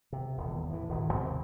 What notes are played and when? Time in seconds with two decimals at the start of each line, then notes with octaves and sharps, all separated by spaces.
0.13 C3
0.37 D#1 E2
0.70 A2 E3
0.89 D#1 G#1 G2
1.13 D#2 C3 C4